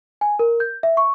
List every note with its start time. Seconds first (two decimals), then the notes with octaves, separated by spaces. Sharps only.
0.21 G#5
0.39 A#4
0.60 G6
0.83 E5
0.97 C#6